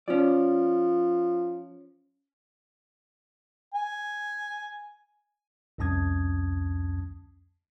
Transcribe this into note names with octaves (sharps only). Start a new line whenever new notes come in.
F3 C#4 D5
G#5
C2 F2 C#4 A5 D#6 G#6